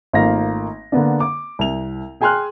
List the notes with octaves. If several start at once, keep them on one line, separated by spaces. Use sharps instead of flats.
G#1 A3 A#3 F4 F5 A#6
D3 A#3 B3 D4
D6
C2 F7
G#4 G5 G#5 C6 F6 F#6